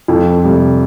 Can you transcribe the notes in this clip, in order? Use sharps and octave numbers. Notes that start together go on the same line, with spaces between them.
F2
C3 G3